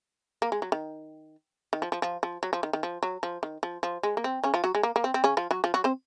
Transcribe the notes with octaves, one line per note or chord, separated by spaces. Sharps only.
A#3
G#3
F#3
D#3
D#3
F3
F3
F3
F3
F#3
F3
D#3
D#3
F3
F#3
F3
D#3
F3
F3
G#3
A#3
C4
C#3 C#4
F3 F4
F#3 F#4
G#3
A#3
A#3
C4
C4
C#3 C#4
F3 F4
F#3 F#4
F3 F4
F#3 F#4
C4 C5